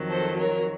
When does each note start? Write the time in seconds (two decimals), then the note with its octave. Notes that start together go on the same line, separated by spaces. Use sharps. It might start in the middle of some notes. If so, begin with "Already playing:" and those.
Already playing: F2 D#3 F#3
0.10 A4 C5
0.39 A#4 C#5